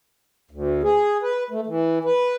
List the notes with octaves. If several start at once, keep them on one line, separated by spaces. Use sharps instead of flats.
D2
G#4
B4
A3
E3
B4